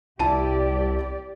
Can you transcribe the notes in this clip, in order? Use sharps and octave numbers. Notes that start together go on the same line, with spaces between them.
C2 E4 G4 D5 A5 D#7